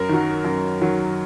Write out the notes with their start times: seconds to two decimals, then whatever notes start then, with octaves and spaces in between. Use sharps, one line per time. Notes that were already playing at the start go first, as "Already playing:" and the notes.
Already playing: F#2 A#4
0.09 D#3 F#3
0.45 F#2
0.82 D#3 F#3